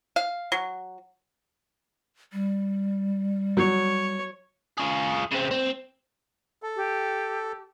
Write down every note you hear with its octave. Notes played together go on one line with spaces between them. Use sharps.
F5
F#3
G3
F#3 C#5
F4 G#4
C#3 C4
C4
A4
G4